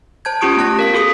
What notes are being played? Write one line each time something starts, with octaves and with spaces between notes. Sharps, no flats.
C5 A5 G6 G#6
C#4 F4 G4 C#6 D#6 D7
A3 B3 A5 F#6 A#6
A#4 F5 B6
F#4 G#4 A4 D#6